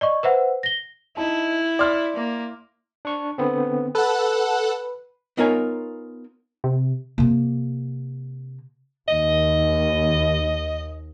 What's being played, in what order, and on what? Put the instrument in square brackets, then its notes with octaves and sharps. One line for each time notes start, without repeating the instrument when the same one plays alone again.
[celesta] D5 D#5 C#6
B4 C5 E5 F#5
A#6 G7
[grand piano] D#4 A5 [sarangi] E4
[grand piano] D5 C6 F6
[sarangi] A#3
[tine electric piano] D4 C#6
D3 B3 C4
[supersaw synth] A4 F#5 [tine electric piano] B4
[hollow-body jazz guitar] B3 D#4 F4 A#4 C#5 G#5
[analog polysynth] C3
[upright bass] C3 A#3
[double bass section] D#2 [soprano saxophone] D#5